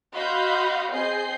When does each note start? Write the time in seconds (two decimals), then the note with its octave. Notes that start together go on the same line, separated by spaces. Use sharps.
0.13 F#4 D#5 F5 B5 C6 G6
0.91 C4 G#4 D#5 G6 C7